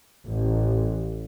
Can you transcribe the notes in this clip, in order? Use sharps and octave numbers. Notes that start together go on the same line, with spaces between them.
A1